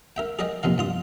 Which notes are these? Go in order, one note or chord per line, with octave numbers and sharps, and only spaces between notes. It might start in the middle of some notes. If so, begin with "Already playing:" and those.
A#4 E5 G5
G#4 A#4 D5 D#5 G5
A#1 F2 C3 D#3 F5
G2 F4 D#6